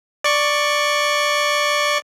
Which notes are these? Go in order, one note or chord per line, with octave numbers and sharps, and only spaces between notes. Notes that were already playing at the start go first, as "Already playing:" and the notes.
D5 C#6